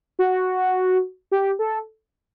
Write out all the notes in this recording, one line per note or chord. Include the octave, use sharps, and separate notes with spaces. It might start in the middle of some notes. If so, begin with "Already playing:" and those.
F#4
G4
A4